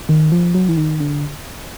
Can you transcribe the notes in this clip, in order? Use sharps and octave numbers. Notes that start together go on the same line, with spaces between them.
D#3
F3
F#3
E3
D#3
D3